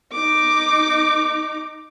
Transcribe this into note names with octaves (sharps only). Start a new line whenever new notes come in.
D#4 D6